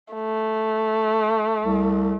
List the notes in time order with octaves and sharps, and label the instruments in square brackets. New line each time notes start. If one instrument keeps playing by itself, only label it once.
[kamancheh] A3
[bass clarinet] C2